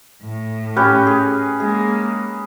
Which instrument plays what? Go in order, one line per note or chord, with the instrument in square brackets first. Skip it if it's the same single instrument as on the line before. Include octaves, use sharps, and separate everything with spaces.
[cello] A2
[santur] C#4 G4 B4
G#4
[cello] G#3 A#3 [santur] G#4